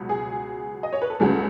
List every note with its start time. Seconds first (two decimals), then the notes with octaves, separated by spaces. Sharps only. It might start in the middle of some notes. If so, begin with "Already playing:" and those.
Already playing: C#2 B2 F#3
0.09 G#4
0.83 D#5
0.93 C#5
1.02 B4
1.10 A4
1.20 C#2 C#3 F#3 A3 G#4